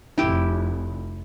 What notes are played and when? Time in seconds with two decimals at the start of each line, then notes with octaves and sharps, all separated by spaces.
0.18 F1 E4 G4